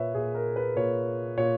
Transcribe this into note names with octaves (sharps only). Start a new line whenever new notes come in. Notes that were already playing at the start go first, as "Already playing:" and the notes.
Already playing: A#2 B4 C#5 E5
A#2 G#4
A#4
B4
A#2 C#5
A#2 C#5